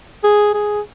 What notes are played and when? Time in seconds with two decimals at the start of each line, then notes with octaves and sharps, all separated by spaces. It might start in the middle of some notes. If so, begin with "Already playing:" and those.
0.24 G#4
0.54 G#4